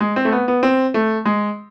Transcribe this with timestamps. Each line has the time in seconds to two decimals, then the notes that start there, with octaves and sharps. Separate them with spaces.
0.01 G#3
0.16 C4
0.25 A3
0.32 B3
0.48 B3
0.63 C4
0.94 A3
1.26 G#3